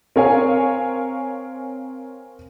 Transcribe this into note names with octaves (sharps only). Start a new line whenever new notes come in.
C4 A#4 C#5 F5 G#5